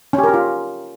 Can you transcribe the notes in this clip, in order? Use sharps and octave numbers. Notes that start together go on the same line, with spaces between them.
C#4
G4
A#4
G4
F4